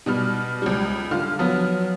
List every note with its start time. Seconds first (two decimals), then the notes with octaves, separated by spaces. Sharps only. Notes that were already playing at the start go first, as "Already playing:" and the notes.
0.06 B2 G3 F6
0.62 C#2 G3
1.11 D3 F4 F6
1.39 F3 F#3 B3